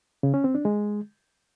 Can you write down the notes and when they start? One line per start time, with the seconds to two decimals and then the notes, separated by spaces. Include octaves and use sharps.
0.23 C#3
0.34 C#4
0.44 C4
0.55 D4
0.65 G#3